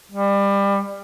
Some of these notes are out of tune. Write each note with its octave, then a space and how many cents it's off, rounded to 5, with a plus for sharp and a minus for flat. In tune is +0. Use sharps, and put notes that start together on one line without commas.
G3 +25